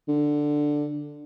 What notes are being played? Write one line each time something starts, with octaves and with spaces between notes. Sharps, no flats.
D3